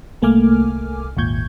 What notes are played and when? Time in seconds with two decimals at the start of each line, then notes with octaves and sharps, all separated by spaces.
0.22 C2 A3 A#3 G#5 D6 F6
1.17 G#1 D#2 A#2 C#6 G6 G#6